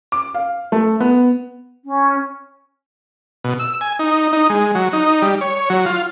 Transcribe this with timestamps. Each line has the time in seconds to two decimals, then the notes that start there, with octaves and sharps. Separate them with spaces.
0.12 D6
0.34 F5
0.72 A3
1.00 B3
1.85 C#4
3.44 B2
3.59 E6
3.81 G#5
3.99 D#4
4.33 D#4
4.50 G#3
4.75 F#3
4.93 D#4
5.22 G3
5.41 C#5
5.70 F#3
5.86 F4